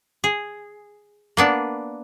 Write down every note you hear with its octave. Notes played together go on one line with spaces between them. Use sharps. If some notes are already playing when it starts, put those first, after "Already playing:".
G#4
A#3 B3 D4